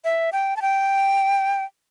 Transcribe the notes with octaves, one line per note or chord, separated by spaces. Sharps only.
E5
G5
A5
G5